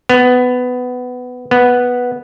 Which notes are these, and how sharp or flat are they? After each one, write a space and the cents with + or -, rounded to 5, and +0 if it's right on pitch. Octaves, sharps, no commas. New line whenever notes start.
B3 +15
B3 -5